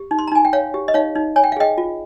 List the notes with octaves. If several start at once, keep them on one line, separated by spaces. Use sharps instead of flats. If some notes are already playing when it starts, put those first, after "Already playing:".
Already playing: G4
D#4
C6
A#5
D#4 G#5
G5
C#5 F5
G4
D#5
D#4 C#5 F5
D#4
C#5 G#5
G5
F5
G#4 D#5 G5
F4